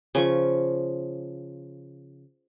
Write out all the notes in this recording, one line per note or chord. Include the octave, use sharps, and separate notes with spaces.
C#3 F3 C#6